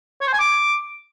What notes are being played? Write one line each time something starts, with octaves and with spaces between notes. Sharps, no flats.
C#5
C5
G#5
D6